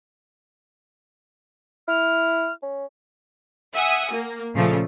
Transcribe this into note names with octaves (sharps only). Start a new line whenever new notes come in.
E4 F6
C#4
E5 F#5 G#5 D#6
A#3
A#2 C#3 F3 A3